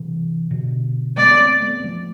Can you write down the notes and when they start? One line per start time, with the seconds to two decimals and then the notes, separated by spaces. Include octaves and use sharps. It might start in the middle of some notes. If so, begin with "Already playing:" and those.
Already playing: C3 E3
0.51 B2 D3
1.17 G#3 B3 D5
1.40 A3 C4
1.62 G#3 B3
1.80 B3
1.84 F3 A3